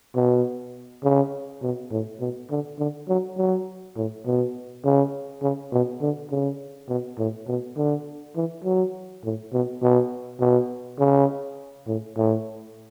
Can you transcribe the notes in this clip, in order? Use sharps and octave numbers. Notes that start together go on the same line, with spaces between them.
B2
C#3
B2
A2
B2
D3
D3
F#3
F#3
A2
B2
C#3
C#3
B2
D3
C#3
B2
A2
B2
D3
E3
F#3
A2
B2
B2
B2
C#3
A2
A2